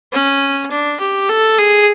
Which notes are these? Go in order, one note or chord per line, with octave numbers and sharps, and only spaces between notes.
C#4
D4
G4
A4
G#4